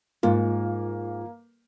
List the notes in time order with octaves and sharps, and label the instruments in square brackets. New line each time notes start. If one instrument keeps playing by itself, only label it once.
[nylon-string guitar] G#2 [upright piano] A#3 [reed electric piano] F4